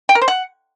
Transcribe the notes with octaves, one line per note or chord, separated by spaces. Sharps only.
G5
A#4
C5
F#5